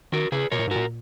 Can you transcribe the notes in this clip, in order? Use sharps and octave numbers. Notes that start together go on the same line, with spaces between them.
D#3 F#4 A#4
C#3 G#4 B4
B2 A#4 C#5
A#2
G#2
A#2 F#4 A#4